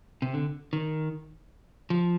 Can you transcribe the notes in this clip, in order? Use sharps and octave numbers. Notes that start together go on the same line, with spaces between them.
C3
D3
D#3
F3